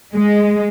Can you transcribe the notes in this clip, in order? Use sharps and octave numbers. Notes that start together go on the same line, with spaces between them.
G#3